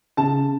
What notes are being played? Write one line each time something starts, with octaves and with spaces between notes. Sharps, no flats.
C#3 A5